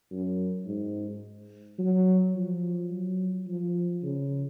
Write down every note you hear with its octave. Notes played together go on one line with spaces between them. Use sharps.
F#2
G#2
F#3
F3
F#3
F3
C#3